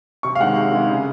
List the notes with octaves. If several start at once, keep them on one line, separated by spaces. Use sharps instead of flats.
C3 C#6
F5
D#3 G#3 F#5
C3
D#3 G#3
C#3